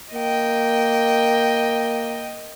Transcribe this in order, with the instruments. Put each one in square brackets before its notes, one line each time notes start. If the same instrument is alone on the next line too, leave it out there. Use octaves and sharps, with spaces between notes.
[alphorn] A#3 [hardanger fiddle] D#5 G5